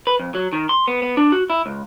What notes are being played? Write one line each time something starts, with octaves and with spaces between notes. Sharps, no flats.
B4
F2
F#3
D#3
C6
B3
B3
D4
F#4
E4
C#2